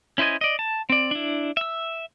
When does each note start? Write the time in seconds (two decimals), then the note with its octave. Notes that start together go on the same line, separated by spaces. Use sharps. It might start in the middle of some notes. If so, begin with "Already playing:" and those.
0.18 C#4 E4 C5 D#5 G#5
0.41 D5 D#5
0.59 A5
0.90 C4 D5
1.11 D4 E4
1.57 E5 E6